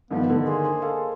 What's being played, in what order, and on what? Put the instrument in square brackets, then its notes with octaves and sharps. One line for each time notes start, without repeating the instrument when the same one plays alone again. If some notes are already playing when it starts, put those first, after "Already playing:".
[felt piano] G2 D#3 F3 [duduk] B3
[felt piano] D3 D#3
[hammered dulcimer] G#3 A#3 C5 [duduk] G#4
[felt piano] A4 F5